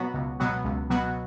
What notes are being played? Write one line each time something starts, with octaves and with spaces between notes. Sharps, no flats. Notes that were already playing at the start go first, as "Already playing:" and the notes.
Already playing: B2 F#3 B3 F#4
C#2
B2 F#3 B3 F#4
C#2
B2 F#3 B3 F#4